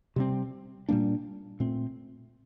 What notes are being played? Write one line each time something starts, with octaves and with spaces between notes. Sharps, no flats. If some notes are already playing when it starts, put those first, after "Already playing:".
C3 G3 C4
A#2 G3 A#3 D4
A#2 A3 C4